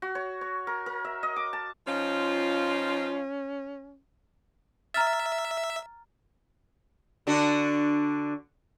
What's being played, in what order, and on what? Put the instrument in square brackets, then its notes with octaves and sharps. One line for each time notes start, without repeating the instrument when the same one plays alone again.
[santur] F#4
C#5
C#5
A#4
A#4
E5
D#5
D6
A5
[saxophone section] F3 D#4 F4 [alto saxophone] C#4
[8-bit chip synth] E5 [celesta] A#5 F6 A6
[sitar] D3 D4 F#4